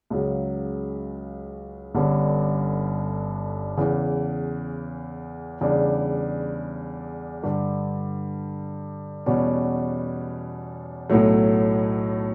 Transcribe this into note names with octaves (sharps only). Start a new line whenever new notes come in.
C#2 C#3 F#3
G1 G2 D3 G3 C#4
E2 C#3 E3
E2 C#3 G3 D4
G2 D3 G3
E2 B2 G3 C#4
B1 A2 F#3 A3